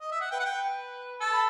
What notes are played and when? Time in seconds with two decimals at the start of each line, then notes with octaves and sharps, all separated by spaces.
0.01 D#5
0.12 E5
0.21 F#5
0.31 B4 G5
0.40 F#5
0.46 G5
1.20 A4 A5
1.32 B5